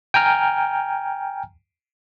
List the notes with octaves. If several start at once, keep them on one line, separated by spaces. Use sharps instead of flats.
G5 G#5 A#5 F6